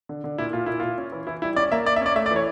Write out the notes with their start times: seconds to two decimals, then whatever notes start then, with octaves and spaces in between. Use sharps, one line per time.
0.09 D3
0.24 D3
0.38 A#2 E4
0.53 A#2 F4
0.66 A#2 E4
0.80 A#2 F4
0.98 C#4
1.12 E3
1.27 E3 E4
1.42 G3 E4
1.56 C#4 D5
1.72 A#3 E5
1.86 A#3 D5
1.96 E5
2.01 C#4 D5
2.15 A3 E5
2.26 D5
2.31 E3
2.36 C#5